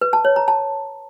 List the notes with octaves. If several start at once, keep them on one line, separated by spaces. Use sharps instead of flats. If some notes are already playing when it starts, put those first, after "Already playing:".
B4
A5
C#5
A#5
A5